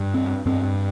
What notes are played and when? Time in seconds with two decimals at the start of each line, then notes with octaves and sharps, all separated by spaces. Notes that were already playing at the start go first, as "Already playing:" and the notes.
Already playing: G2
0.14 C4
0.46 G2 C4